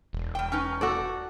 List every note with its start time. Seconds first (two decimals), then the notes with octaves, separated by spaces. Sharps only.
0.13 E1
0.35 G3 G5
0.52 C#4 D#4 B4
0.81 F#4 A4 D5